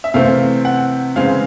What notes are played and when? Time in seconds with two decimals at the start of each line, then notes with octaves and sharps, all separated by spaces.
0.04 E5
0.14 C3 E3 A3 C4 F5
0.65 F#5
1.16 C#3 E3 G#3 C4 F5